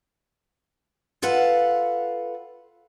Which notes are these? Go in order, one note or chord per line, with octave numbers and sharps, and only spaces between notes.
F4 A4 B4 F5 F#5